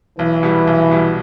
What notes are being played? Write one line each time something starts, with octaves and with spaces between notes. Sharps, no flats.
B1 E3
B2 G3
B1
B2 G3